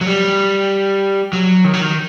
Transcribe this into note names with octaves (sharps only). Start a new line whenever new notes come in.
F#3
G3
F#3
D#3
F#3
D#3